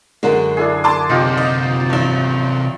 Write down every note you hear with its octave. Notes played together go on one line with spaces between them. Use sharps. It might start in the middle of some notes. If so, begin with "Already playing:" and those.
F#2 D3 G#3 F#4 A#4
D4 E4 G#4
A5 C6 D6
C3 F#3 D#4 F4 G4
D#5
A1 G2